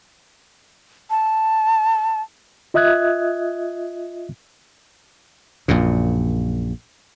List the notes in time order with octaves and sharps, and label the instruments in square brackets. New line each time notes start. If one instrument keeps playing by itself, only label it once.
[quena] A5
[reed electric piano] F4 D#5 E5 D#6 F#6 G#6
[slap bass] A#1 F#2 A#2